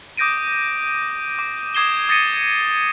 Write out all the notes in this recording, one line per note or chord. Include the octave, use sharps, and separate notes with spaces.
D6 D#6 G6 A#6 D7 D#7
D6
D6 D#6 G#6 C7 E7 G7
D#6 A6 A#6 C#7 D#7